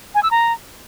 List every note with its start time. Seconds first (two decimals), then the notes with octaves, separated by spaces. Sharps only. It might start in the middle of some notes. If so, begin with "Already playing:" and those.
0.15 G#5
0.23 E6
0.31 A#5